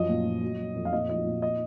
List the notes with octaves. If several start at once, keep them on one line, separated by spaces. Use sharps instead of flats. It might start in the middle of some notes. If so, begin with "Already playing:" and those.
Already playing: F#2 F3 D#5
A#2
A#2
F#3
F#3
F2
F5
A#2 D#5
F3 D#5
A#2
D#5